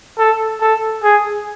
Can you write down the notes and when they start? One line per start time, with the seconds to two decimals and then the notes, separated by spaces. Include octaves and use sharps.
0.18 A4
0.62 A4
1.03 G#4